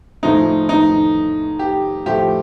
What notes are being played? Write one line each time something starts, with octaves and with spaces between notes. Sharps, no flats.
A2 F3 A3 D#4
D#4
G4
A2 F3 A3 G4